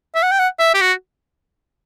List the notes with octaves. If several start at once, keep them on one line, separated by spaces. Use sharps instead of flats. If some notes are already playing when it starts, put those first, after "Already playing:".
E5
F#5
G5
F#5
E5
G4
F#4